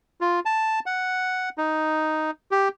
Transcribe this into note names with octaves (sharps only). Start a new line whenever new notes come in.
F4
A5
F#5
D#4
G4